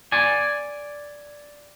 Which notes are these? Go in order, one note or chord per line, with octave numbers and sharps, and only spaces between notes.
D5 G#5